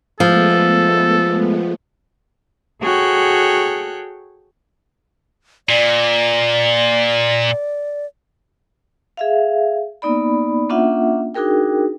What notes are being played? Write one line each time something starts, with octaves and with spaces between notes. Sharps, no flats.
F3 G#3 A3 B3 A4
F#4 G#4 A4 C#5 G5 F#6
A#2 D5
G#4 E5 F5
A#3 B3 D#4 D5 B5
A#3 C#4 D4 F4 E5 F#5
D4 D#4 F#4 G#4 A#4 G5